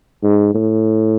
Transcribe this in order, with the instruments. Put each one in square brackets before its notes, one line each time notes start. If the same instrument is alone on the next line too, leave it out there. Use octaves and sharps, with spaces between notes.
[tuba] G#2
A2